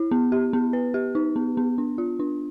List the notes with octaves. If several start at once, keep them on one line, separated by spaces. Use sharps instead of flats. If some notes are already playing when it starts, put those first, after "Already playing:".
Already playing: E4
B3
G4
B3
B4
G4
D#4
B3
B3
D4
F4
D4